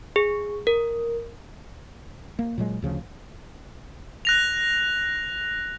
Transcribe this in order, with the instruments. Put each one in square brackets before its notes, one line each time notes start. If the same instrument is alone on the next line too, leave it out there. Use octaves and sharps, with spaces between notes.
[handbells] G#4
A#4
[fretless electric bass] A#3
A#2 F#3 G#3
D2 C#3 F3
[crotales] F#6 A#6 F7